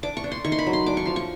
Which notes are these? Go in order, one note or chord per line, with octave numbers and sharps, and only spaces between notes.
D4 D6
C#6
D4
C6
D#3 C#6
C6
B5
F#3
C6
D4 D6
C#6
F3 C6
C#6